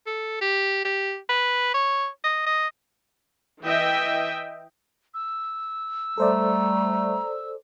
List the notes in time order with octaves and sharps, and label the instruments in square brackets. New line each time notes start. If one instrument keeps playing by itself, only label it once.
[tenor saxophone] A4
G4
G4
B4
C#5
D#5
D#5
[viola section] E3 D#5 E5 G5
[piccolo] E6
[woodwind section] G3 A3 [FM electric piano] A4 C5 D5 [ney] A#5